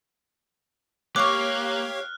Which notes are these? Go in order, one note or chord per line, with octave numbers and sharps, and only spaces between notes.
A#3 G4 C#5 F5 C#6 D6 F6 F#6